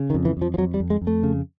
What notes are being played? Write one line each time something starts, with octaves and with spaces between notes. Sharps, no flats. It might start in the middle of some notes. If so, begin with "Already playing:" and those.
Already playing: C#3
D#3
F2
E3
F2 F3
F3
F2 F#3
G3
F2
G#3
F2
A3
C#3